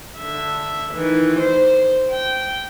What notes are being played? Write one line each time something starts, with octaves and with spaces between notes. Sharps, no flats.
D3 E5
D#3 E3
C5
G5